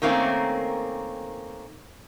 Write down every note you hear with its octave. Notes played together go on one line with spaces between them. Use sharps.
D#3 A3 A#3 C4 C#4